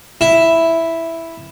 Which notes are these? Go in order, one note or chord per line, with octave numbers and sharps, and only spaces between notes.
E4